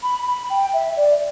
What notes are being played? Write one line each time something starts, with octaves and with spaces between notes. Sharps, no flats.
B5
B5
G5
E5
D5